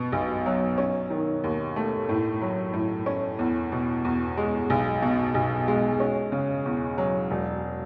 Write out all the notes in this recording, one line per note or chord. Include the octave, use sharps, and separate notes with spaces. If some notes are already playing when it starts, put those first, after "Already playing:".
Already playing: B2 B3
B1
F#3
C#4
D#3
D#2
A3
A2
F#3
A2
C#4
E2
B2
E2
G#3
B1
B2
B1
G#3
C#4
C#3
E2
F#3
E1